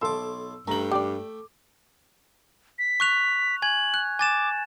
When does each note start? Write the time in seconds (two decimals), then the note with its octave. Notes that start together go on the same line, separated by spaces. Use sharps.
0.02 B1 A4 C6 D6 E6
0.68 G2 A3 G5 A#5 F#7
0.91 G4 D5 D6
2.79 B6
3.00 C#6 F#6 F7
3.62 G#5 G#6 F#7
3.94 F#6
4.19 G#5 D6 A6 E7